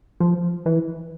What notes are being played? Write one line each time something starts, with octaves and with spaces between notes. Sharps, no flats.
F3
E3